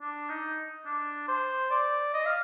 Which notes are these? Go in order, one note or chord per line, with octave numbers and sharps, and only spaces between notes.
D4
D#4
D4
C5
D5
D#5
F5